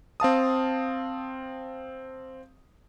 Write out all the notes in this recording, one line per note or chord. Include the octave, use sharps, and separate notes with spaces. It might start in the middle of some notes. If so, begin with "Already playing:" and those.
C4 F5 A5 D#6